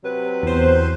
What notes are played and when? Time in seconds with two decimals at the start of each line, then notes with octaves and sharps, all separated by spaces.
0.04 C3 F#3 B4
0.43 E2 C5